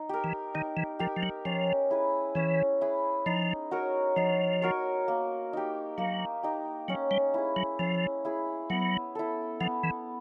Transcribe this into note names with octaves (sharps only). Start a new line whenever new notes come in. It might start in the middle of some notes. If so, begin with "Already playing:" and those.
Already playing: D#4
G4 A#4
E3
D#3 D#4
E3
F3 G4 A#4
F3
F#3
F3 C#4
E4 G#4 B4
E3 C#4
E4 G#4 B4
F3 D#4
F#4 A#4 C#5
F3 D#4
F#4 A#4 C#5
A#3
D#4 G4
F#3 A#3
D#4 G4
F#3 C#4
G3
E4 G#4
F#3
F3 C#4
E4 G#4
F#3 B3
E4 A4
F3 B3
E3